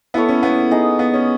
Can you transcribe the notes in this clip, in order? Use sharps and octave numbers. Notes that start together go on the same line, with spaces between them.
B3 E4 A4 C#5
C#4
B3
D#4 G#4 D#5
B3
C#4